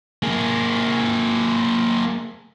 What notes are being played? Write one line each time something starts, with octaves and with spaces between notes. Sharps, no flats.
A#3 G#4